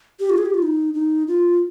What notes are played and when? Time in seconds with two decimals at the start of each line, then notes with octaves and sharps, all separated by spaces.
0.20 G4
0.30 F4
0.38 G#4
0.46 G4
0.54 F4
0.62 D#4
0.94 D#4
1.28 F4